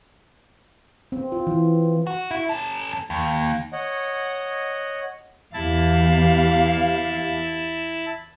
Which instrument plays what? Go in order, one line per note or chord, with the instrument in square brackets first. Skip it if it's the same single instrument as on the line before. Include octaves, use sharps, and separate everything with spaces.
[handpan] C4
F4
E3
[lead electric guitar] F#4
E4
C#4 A4
D#2
[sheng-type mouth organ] C#5 D#5 F#5
[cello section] E2 G4 F5 [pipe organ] E4 A5